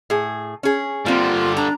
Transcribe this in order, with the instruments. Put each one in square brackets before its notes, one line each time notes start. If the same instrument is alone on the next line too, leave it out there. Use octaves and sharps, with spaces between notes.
[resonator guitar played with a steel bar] A2 G#4
C#4 G#4
[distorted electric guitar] D3 G3 [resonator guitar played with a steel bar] A#3 C4 [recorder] F4
[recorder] D4 [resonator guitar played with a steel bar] A#5